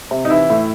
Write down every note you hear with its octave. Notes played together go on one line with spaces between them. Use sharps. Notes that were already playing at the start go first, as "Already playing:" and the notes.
C3
D#4
E3 E4
A2